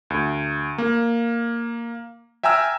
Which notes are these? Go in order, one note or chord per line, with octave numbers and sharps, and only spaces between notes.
D2
A#3
E5 G5 G#5 A#5 E6 F6